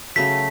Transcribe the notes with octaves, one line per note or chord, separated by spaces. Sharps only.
C#3 F#3 A3 B6